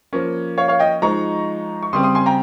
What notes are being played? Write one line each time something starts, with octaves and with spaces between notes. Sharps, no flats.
F3 A#3 C#4
C#5 F5
C#5 F5
D#5 G5
F3 G#3 D#4 A#5 C#6
C#6
C#3 G3 C4 C6 D#6
C6 D#6
G#5 C6
G5 A#5